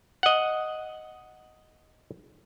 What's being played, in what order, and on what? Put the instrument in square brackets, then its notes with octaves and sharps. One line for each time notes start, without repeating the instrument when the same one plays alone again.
[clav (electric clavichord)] D#5 F#5